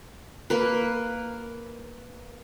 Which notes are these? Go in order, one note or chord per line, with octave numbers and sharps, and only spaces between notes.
A#3 B4